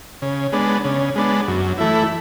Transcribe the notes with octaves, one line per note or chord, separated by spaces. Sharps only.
C#3
G#3 B3 D4
C#3
G#3 B3 D4
F#2
E3 A3 E4